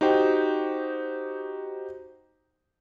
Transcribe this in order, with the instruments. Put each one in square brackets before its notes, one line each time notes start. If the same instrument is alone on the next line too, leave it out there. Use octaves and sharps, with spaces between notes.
[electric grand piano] D#4 F#4 G4 C5 G5